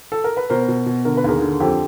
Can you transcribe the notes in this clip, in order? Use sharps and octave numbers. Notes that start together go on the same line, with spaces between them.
A4
A#4
B4
B2 A#4 C5
B2
B2
D3 A#4
B4
D#2 G#4 A#4
D3
F2 G4 A4